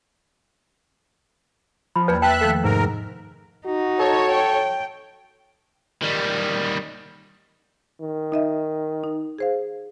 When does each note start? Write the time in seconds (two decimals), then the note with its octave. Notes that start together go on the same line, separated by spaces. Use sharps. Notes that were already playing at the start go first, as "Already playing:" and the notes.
1.96 F3 B5
2.08 E2 G3 A#3 B4 G#6
2.22 E5 G5 A5 F#6
2.41 D#3 F3 A3 A4
2.64 G#2 C3 A#4
3.66 D#4 F#4
3.99 A4 C#5
4.31 G5
6.02 D#3 G3
8.00 D#3
8.32 D#4 D#5 E5
9.04 D#4
9.39 G#4 C5 F5